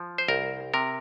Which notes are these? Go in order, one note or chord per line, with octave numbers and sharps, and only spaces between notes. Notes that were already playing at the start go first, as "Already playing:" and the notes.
Already playing: F3
C5
C2 A#4
C3 A#4